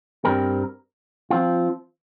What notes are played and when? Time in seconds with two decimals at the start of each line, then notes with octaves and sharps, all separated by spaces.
0.25 G2 G3 C4 A#4
1.30 F3 C4 F4